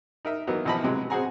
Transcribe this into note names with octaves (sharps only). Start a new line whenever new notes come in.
D#4 A#4 E5
E3 F#3 A#3 B3 D#4
B1 E3 F3 D#5 A5 B5
C3 F#3 G#3
C4 F#4 G#4 F#5 G#5 A#5